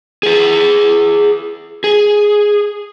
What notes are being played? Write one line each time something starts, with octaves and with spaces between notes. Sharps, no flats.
G#4 B4
G#4